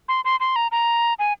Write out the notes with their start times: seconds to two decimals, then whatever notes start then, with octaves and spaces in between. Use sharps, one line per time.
0.08 C6
0.25 C6
0.40 C6
0.56 A#5
0.72 A#5
1.19 G#5